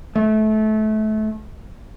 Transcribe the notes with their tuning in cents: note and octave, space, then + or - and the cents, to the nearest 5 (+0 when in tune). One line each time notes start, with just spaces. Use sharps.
A3 -25